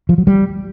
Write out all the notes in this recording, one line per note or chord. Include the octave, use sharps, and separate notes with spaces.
F3
F#3
G3